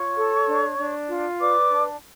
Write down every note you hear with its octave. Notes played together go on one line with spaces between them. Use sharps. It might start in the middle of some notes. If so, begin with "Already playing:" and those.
Already playing: F4 C#5 C#6
A4
D4
D4
F4
B4 D5 D6
D4